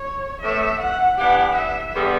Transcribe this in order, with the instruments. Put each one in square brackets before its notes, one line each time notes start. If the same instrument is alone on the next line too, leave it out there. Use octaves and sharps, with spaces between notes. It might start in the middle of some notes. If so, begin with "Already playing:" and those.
Already playing: [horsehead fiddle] C#5
[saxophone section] A2 E3 A3 [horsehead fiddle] E5
[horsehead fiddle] F#5
[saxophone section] E3 B3 D4 G4 [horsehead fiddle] F#5
[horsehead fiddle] E5
[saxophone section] E2 D3 G3 B3